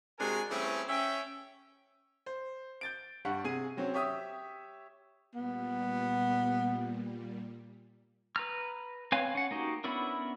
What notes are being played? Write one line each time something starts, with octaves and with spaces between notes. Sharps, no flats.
C3 G#3 D4 F#4 A#4 G#5
E3 G3 A3 C4 C#4 G#4
C#4 E5 G5
C5
G6 A6 D7
G2 G3 F#5 C#6
C3 G#4 G#5 D#7
F#3 C4 C#4
G4 C#5 E5 D#6 E6
A#2 G3 B3
B4 A#5 F6
C4 B4 C#5 F5 G#5
C#4 F#5
A#3 D#4 F#4 G4
B3 C#4 D4 E4 A#4